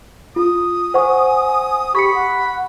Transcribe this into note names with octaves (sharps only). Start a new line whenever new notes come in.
F4 D#6
C5 F#5 G#5 C#6
G4 B5 C#6 C#7
F#5